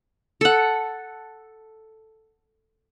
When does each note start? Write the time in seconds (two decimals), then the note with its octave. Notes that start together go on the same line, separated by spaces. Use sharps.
0.41 A4 F#5